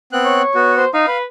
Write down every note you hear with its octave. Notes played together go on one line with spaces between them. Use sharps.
B3 C4 F#6
C#5
B3 F#4
C5
D#4 F5
B4